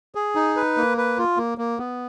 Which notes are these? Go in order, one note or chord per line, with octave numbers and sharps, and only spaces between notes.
G#4
D#4
B4
A#3
B4
F4
A#3
A#3
B3